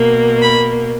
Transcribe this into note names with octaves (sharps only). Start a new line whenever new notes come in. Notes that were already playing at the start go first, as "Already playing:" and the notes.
Already playing: B2 A#3
B5